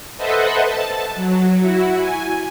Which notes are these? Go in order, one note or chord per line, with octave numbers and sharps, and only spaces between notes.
A4 B4 C5 D#5 E5 F#5
A5
F#3
E4 F#4
G#5